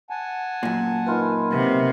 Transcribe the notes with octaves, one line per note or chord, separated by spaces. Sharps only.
F#5 G#5 A5
F#2 A#2
D#3 F4 B4
C3 B3